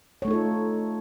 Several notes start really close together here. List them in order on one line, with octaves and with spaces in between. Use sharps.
C#5 A3 D#4 A4 F4